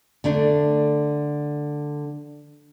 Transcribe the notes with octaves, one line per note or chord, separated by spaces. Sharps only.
D3 A3 D4